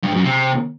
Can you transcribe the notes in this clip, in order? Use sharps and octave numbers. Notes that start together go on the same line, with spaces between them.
G2
F#2
C3